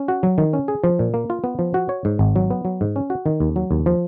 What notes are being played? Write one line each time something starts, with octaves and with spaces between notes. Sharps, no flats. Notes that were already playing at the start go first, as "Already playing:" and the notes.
Already playing: C#4
F#4
F#3
D#3
C#4
G#4
F3
A#2
A#3
F4
B3
F3
F#4
C#5
G#2
G#1
F#3
B3
F#3
G#2
C#4
F#4
D#3
D#2
F#3
D#2
F3